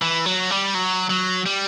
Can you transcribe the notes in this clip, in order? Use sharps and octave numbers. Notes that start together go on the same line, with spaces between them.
E3
F#3
G3
F#3
F#3
G3